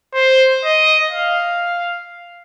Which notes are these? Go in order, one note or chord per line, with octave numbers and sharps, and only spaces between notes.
C5
D#5
F5